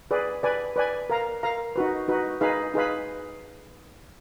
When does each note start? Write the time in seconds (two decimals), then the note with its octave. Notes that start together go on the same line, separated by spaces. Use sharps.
0.11 G#4 B4 D5
0.43 B4 D5 G#5
0.76 B4 D5 G#5
1.10 A#4 F5 A#5
1.43 A#4 F5 A#5
1.76 D#4 F#4 B4
2.08 D#4 F#4 B4
2.41 D#4 G#4 B4 F5 B5
2.74 D#4 G#4 B4 F5 B5